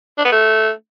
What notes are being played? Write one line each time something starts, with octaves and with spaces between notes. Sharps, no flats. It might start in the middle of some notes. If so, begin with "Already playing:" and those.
D4
B3
A3